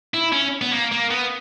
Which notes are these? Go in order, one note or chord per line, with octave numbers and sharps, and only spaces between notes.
E4
C#4
B3
A#3
A#3
B3